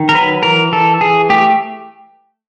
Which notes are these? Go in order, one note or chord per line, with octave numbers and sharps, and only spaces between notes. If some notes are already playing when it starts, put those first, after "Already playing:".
Already playing: D#3
A#4
F#3 B4
E3 A#4
E3 A4
E3 G#4
A3 G4